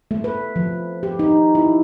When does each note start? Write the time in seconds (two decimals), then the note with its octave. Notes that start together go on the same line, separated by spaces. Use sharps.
0.11 A3
0.24 B4
0.56 F3
1.03 G4
1.19 D#4
1.55 E4